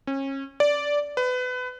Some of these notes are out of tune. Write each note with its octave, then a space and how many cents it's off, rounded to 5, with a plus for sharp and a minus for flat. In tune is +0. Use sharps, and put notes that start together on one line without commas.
C#4 -30
D5 -10
B4 +25